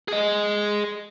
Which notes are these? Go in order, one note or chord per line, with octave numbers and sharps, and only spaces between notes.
G#4 D#5